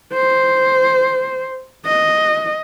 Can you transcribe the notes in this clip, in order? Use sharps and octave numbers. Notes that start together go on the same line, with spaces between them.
C5
D#5